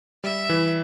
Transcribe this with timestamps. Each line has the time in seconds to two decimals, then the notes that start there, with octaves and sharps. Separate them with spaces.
0.24 G3 E5
0.49 E3